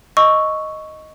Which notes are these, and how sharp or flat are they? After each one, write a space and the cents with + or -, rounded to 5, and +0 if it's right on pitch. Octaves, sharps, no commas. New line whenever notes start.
D#5 +0 C#6 +0 E6 +0